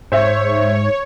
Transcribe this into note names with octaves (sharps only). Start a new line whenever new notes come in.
G#2 C5 C#5 E5